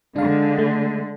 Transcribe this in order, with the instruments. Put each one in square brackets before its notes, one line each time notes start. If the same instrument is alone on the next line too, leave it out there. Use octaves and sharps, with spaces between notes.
[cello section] D3 G#3 [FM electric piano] D4 F5
[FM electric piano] A3